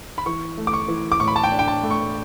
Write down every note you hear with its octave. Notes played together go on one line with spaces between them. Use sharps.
B5
E3 C#6
A3
D6
C#6
E3
D6
A2 C#6
B5
A5
G5
D4
G5
A5
A3
C#6